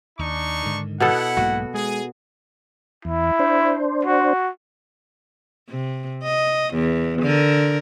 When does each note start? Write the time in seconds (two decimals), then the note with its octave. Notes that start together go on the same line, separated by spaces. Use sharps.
0.19 D#2 D4 D#4 C#6
0.62 G#2 D3 D#3
1.00 B2 B3 E4 A4 F#5
1.37 B1 G#2 A#3 F#4
1.74 G#3 G#4
3.05 E2 E4
3.39 D4 C5
4.04 F#4
5.69 C3
6.23 D#5
6.74 E2
7.22 D3 A#4